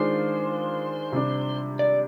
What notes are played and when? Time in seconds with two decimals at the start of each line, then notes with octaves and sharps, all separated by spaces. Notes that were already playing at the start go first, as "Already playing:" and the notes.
Already playing: D#3 G#3 D4 F4 C5
1.12 C3 G3 D4
1.79 D5